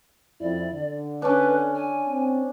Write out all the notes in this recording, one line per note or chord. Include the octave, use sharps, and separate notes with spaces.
F2 E4 D5
D3
C#4 D4 B4
G#5
C4